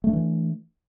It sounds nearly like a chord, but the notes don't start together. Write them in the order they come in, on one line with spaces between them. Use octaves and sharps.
A3 D4 E3